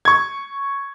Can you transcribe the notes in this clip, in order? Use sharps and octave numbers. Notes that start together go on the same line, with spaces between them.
C#6 G#6